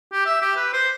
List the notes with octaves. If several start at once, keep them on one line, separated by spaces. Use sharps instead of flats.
G4
E5
G4
B4
C5